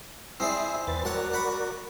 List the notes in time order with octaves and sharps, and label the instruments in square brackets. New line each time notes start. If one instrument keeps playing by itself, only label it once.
[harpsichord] C4 G#4 D5 [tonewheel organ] E4 E5 D#6
[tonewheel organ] E2 B4 A6
[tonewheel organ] F#4 A#4 D5 [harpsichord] C#5 F#5 A5
[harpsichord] F#5 B5 C#6